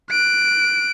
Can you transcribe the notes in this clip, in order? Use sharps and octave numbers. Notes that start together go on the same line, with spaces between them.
F#6 D7